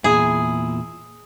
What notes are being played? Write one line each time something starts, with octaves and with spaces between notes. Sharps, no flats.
E2 A#2 E4 G#4